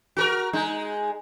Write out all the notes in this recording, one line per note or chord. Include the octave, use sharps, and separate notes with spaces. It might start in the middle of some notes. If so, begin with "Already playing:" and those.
F#4 A4 A#4
G#3 D#4